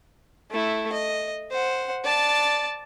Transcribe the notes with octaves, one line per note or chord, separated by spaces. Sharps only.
A3 E4
D#5
C5 F#5
D5 A5